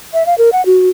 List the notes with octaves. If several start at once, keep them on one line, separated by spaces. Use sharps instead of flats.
E5
F5
A#4
F#5
F#4